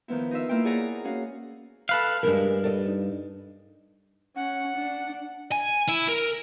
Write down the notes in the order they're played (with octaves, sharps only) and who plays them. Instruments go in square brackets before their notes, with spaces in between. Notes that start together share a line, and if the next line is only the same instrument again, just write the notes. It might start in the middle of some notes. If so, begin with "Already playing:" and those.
[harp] D#3 F3 B3 E4
D#4 F4 E5
A#3 E4 F4 G5
G#4 C#5 D5 F#5 A#5
C#4 F#4 F5
[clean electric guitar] A4 B4 F5
[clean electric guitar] B1 G2 [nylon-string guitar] G#3 A#4
[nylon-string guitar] A4 D5 D#5
D#4
[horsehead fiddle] C#4 [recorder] F#5
[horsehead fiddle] D4
[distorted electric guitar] G#5
E4
A#4